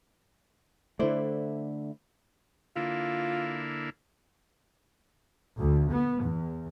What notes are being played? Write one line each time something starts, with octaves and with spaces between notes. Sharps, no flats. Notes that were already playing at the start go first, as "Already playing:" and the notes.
D3 A3 E4 C5 D5
D3 A#3 E4 F4
D2
B3
E2